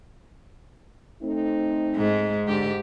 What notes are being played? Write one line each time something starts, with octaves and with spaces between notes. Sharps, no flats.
A3 C4 D#4
G#2 G#3
G#2 D3 G4